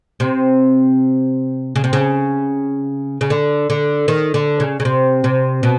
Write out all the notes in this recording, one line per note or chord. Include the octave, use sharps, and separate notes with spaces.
C3
C#3
C3
C#3
C#3
D3
D3
D#3
D3
C#3
C#3
C3
C3
B2